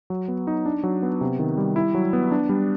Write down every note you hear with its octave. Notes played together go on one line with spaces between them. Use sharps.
F#3
B3
D#4
D4
F#3
B3
C3
D#3
G3
E4
F#3
B3
D4
G3